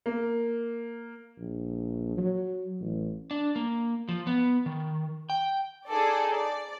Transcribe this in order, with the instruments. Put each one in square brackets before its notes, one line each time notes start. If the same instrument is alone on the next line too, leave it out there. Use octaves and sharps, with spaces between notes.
[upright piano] A#3
[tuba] A#1
F#3
A1
[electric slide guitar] D4
A#3
F3
B3
D#3
G5
[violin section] D#4 G#4 A4 D5
D5